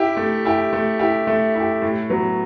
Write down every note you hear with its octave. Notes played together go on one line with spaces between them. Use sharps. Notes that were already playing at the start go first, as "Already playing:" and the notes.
Already playing: E4 G4
A3
E4 G4
A3
E4 G4
A3
E4 G4
A2
F#3 B3